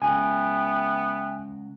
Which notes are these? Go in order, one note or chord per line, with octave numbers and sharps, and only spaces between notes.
C#2 F#3 B3 E5 G5 G#5